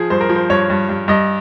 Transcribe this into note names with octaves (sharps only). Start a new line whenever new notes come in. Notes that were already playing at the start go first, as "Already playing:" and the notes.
Already playing: F3 G#4
G2 C5
A#4
F3
C5
G2 C#5
G2
G2
G2 D#5